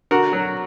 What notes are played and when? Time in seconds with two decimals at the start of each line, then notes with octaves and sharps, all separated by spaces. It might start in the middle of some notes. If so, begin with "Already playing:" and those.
0.11 D3 F#4 A#4
0.33 F#3